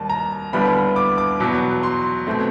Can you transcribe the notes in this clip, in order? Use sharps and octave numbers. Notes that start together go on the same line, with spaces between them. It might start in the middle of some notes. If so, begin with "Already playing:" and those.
Already playing: D#2 D#3 G3 A5
A#5
D#2 D3 G3 B3 E4 B5
D6
D6
E2 B2 F#3
C6
B2 F#3 A3 C4